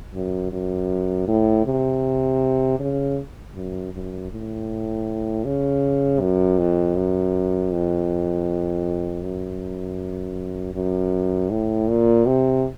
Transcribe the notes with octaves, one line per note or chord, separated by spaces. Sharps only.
F#2
F#2
A2
C3
C#3
F#2
F#2
A2
C#3
F#2
F2
F#2
F2
F#2
F#2
A2
A#2
C3